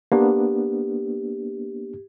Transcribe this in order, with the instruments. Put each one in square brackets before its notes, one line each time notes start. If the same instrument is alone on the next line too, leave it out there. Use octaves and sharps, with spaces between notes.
[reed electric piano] A#3 B3 D4 [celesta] G4